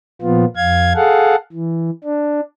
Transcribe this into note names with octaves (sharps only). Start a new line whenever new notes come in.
A#2 F3 B3 F4
F2 F5 G#6
G#4 A4 F5 F#5
E3
D4